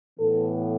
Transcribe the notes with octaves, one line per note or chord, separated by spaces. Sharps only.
A2 E3 B3 A4